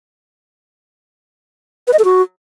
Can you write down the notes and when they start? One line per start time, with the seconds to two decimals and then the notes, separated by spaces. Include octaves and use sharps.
1.88 B4
1.93 D#5
1.99 A4
2.05 F#4